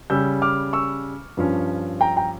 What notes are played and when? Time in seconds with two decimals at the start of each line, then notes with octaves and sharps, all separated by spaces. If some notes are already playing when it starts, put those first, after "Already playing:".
0.10 C#3 G3 C#4 E6 G6
0.42 D6 F6
0.73 C#6 E6
1.37 G2 F3 C#4
2.01 G5 A#5
2.17 G5 A#5